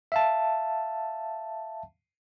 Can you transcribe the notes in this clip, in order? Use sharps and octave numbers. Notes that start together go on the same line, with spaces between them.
E5 F5 A5